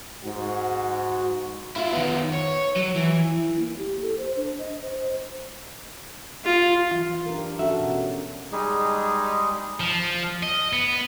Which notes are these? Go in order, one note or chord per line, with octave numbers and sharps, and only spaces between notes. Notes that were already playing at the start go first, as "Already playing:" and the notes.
G#2 F#4
E4 F4
D#3 B3
C#5
F#3
E3
E4
A#3
G4
A4
C5
D4
D#5
C5
F4
E3 F#3 F4
D4 G4 A#4
C#4 D4 F#4 A4 E5
B2 C#4
G3 G#3 D#4 G#4
F3
D#5
B3